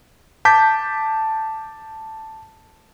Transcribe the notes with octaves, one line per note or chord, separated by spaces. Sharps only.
A5 D6 G6 B6